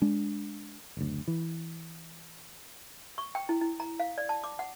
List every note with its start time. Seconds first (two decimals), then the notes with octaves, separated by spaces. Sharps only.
0.02 G#3 D4
0.97 F#1 D2
1.28 E3
3.18 C#6
3.35 G5
3.49 E4
3.61 E4
3.80 A#5
4.00 F5
4.18 D5
4.29 A5
4.44 D6
4.59 F#5